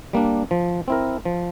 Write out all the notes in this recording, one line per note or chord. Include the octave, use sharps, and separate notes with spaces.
G3 A#3 D4
F3
C4 E4 A#4
F3